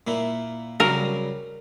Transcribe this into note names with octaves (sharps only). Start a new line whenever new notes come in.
A#2 A#3 E4
C#3 F#3 G3 A#4